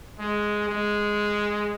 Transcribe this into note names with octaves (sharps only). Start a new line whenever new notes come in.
G#3
G#3